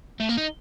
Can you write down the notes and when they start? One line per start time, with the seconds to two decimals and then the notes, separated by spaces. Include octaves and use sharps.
0.20 A3
0.29 A#3
0.37 D#4